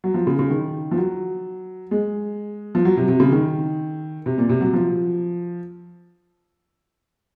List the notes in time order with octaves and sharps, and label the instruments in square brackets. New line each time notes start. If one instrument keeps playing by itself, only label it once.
[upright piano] F#3
F3
C#3
C#3
D#3
F3
F#3
G#3
F3
F#3
C3
C3
C#3
D#3
C3
A#2
C3
F#3
F3